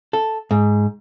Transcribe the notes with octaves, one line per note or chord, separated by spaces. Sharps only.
A4
G#2